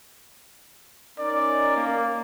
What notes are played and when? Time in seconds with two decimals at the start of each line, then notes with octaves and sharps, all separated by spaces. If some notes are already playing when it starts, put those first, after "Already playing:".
1.18 C#4 D#4 A#4 D5
1.77 A#3